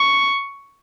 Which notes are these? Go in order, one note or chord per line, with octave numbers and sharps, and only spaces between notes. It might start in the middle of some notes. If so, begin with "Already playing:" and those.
Already playing: C#6